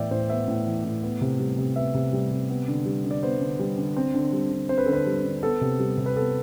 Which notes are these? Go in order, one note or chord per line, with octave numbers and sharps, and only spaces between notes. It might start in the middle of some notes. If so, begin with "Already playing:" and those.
Already playing: A2 E3 B3 D5 E5 G5
A2 C5
B3 E5
A2
E3
A2
B3
C3
G3
C3
B3 E5
C3
G3
C3
B3
D3
G3
D3
D5
B3 C5
D3
G3
D3
C4
D3
G3
D3
C4 C5
B4
D3 A4
B4
G3
D3
B3 A4
C3
G3
C3
B4
B3 A4